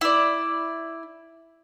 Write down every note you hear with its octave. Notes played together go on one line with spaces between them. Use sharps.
E4 D5